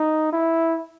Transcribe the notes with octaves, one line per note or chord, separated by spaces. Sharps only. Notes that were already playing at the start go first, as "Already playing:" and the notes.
Already playing: D#4
E4